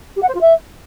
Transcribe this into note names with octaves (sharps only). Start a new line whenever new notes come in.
G4
F#5
C5
F4
E5